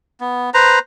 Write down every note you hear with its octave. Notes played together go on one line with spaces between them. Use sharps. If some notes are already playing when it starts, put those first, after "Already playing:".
B3
B4 C5 A#5